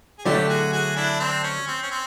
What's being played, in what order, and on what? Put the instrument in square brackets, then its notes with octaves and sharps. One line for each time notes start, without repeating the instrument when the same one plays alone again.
[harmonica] G#4
[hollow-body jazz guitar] D3 F#3 A3 [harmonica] G4 A4
[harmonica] F#4 G#4
F#4 G#4
D4 E4
C4 D4
C#4
C4
C#4
C4